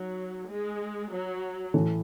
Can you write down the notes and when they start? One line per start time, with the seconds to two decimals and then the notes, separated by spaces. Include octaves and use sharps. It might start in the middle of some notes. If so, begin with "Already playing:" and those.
Already playing: F#3 D#4
0.49 G#3
1.11 F#3
1.74 A2 E3 A3